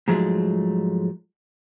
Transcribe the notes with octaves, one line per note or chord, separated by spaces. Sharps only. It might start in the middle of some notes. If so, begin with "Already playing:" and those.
G#2 F3 F#3 G#3 A3